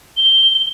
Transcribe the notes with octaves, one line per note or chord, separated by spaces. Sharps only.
G7